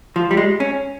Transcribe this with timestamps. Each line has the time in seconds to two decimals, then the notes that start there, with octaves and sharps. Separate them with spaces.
0.16 F3
0.31 G3
0.37 G#3
0.60 C#4